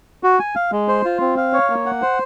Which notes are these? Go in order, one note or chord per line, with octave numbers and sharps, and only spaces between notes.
F#4
G#5
F5
G#3
C5
F4
C4
F5
C#5
A#3
F#5
C5